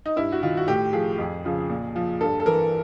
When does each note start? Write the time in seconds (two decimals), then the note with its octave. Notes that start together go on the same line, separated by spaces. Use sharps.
0.06 D#4
0.16 G2 E4
0.32 F#4
0.43 D#3 F4
0.57 F#4
0.67 A2 G4
0.93 F3 G#4
1.18 F2
1.45 C#3 F3
1.69 A#2
1.96 F3
2.21 G2 A4
2.40 A4
2.46 E3 A#4